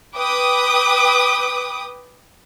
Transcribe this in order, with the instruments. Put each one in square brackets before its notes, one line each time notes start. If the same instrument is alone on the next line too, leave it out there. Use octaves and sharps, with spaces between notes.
[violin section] B4 G5 D6 D#6